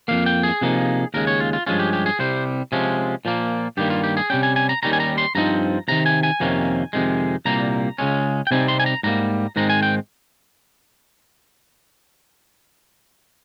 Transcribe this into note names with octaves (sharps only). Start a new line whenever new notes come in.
F2 D#3 A#3 F5
G5
G#4
C3 F3 A#3 D#4
D#2 C#3 G#3 A#4
C#5
F4
F4
G2 F3 G#3 C#4 F4
G4
G4
G#4
C2 C3 G3 C5
C3 F3 G#3 C#4
A#2 F3 A#3
G2 D#3 G3 A#3 G4
F4
G4
G#4
C3 G3 C#4 G5
G#5
G#5
A#5
D#2 D#3 G3 C#4 A#5
G#5
A#5
C6
G2 F3 C4 D#4 A#5
C#2 C3 D#3 A#5
G#5
G#5
F2 C3 D#3 A#3 C#4
F2 C3 D#3 G#3
C2 A#2 G3 A#3 A#5
C#2 C#3 G#3 C#4
G5
C3 G3 C4 D#4 G#5
C6
G#5
A#5
G#2 G3 A#3 A#5
G#2 D#3 G#3 C4 A#5
G#5
G5